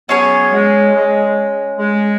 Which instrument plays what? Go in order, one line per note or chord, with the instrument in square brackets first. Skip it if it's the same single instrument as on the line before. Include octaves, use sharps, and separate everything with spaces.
[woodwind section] F#3 B3 [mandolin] C#4 G#4 C#5 G#5
[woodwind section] G#3
G#3
G#3